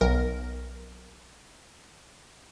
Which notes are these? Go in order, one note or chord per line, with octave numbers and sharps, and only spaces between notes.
B1 A#4